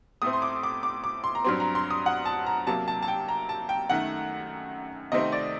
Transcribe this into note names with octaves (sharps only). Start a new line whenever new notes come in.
A2 A3 C4 D#6
C6
D6
D6
D6
D6
C6
A#5
G2 F#3 C4 C6
A#5
C6
D#6
F#5
A5
A#5
C3 F#3 A#3 A5
A5
A5
G5
A#5
A5
G5
F#2 D#3 A3 F#5
C3 D#3 A3 C4 D#5
D5